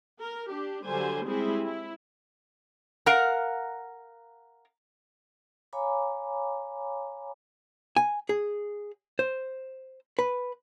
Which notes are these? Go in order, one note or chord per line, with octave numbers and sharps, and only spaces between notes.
A#4
D4 G4
D3 F#3 G3 C5 G#5
G3 G#3 C4 E4 G#4
E4
A#4 F5 F#5 A#5
C#5 F5 G#5 A#5 B5 D6
G#5
G#4
C5
B4